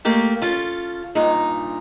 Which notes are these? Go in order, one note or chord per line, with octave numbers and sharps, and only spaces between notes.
A3 A#3 G4 F5
C#4 F4 A4
G2 A#2 D#4